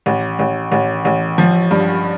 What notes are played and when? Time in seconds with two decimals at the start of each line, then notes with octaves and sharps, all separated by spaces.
0.06 A1
0.39 A1
0.72 A1
1.05 A1
1.38 F3
1.71 G2